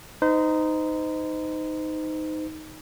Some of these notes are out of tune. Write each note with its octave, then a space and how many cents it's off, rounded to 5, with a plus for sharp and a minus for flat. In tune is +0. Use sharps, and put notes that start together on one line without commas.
D#4 +0 C5 -35